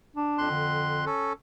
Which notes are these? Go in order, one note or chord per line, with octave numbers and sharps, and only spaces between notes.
D4
F2 C6 F#6
D3
C#4 A4